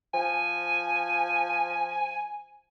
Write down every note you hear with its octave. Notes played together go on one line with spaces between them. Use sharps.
F3 G#5